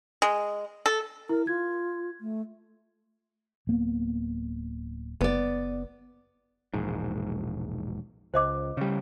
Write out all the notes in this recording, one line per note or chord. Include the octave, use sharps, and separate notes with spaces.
G#3
A4
E4 A#4
F4 G#6
A3
D1 A#3 B3
F#1 B3 D5
E1 A#1 G#2
C#2 C5 D#5 D6
C#3 G3